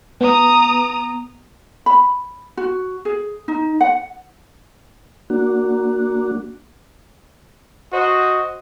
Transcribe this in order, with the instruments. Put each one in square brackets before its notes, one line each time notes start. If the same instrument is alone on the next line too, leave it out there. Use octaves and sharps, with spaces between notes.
[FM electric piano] B3 [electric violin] A#5 D#6
[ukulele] B5
F#4
G#4
D#4
F#5
[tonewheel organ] A#3 D4 F#4
[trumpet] F#4 [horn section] C5 D#5